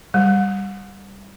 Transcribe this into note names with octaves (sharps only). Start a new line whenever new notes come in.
G3